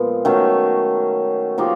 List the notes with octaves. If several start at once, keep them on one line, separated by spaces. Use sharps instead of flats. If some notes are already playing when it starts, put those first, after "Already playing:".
Already playing: A#2 F3 G#3 B3
D#3 F#3 A3 C#4
F3 A#3 D#4 G4